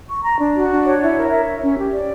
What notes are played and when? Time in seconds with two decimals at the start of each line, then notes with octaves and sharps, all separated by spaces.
0.09 C#6
0.24 A#5
0.39 D4
0.55 F#4
0.70 D4
0.85 C#5
1.00 E4
1.16 A#4
1.31 E5
1.46 C#5
1.61 C#4
1.77 G4
1.93 D5